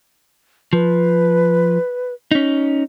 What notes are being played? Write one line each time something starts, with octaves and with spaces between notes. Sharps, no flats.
F3 B4
C#4 D#4